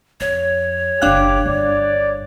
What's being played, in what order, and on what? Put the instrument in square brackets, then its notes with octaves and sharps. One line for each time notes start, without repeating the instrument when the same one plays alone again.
[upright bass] F2 [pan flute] C#5
[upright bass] F#1 B1 [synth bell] D4 F5 F#6 [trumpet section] G4 D6
[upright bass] G1 G2 [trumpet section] D5